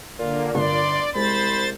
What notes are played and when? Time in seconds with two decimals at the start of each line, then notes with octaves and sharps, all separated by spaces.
0.19 A#2 D3 A#3 F4
0.55 G1 D5 C6
1.15 C2 G#3 C5 B5 A6